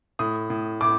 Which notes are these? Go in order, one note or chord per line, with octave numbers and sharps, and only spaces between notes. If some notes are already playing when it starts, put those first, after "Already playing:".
A2 D#6
A2
A2 D6